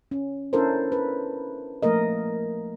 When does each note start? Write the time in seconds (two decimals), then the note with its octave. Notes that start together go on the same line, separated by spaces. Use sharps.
0.11 C#4
0.53 C#4 D4 E4 A4 A#4 C5
0.92 B4
1.83 F3 A3 A#3 A#4 D#5